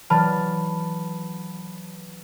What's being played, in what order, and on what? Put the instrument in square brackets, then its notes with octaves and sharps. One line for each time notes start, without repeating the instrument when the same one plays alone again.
[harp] E3 F#3 D5 [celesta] A5 B5 F6